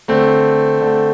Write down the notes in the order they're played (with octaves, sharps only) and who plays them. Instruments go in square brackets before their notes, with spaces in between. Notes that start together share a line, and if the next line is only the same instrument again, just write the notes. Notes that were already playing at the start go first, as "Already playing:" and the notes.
[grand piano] D3 A3 C4
D3 A3